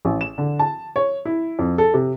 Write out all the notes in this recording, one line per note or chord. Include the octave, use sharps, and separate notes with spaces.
A1
E7
D3
A5
C#5
E4
F2
A4
C3